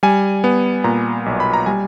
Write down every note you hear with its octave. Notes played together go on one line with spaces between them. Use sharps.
G3 G#5
B3
A#2 A#5
B1
B5
A#5
G3 G#5